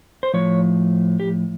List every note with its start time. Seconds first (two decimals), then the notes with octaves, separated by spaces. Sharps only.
0.23 C5
0.34 A2 F3 C#5
1.20 G4